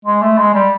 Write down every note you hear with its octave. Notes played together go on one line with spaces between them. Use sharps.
G#3
A3
G#3
G3